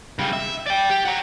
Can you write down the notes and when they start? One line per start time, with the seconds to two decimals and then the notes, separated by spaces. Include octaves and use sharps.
0.19 C#3 G3
0.33 E5
0.66 D5 G5
0.90 G4
1.05 F#5 A#5